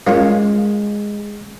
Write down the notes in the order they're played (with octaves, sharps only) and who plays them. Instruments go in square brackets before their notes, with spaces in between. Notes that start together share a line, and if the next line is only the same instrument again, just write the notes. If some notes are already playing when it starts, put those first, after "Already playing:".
[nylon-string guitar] G#3 [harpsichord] A#3 C#4 F4